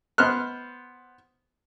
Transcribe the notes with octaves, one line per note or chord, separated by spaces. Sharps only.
B3 C5 F6 F#6